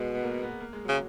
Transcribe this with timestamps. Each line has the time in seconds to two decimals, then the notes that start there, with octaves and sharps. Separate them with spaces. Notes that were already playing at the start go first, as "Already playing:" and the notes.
Already playing: B2 G#3
0.15 B3
0.23 A#3
0.42 B3
0.60 A#3
0.73 G#3
0.85 C#3 F#3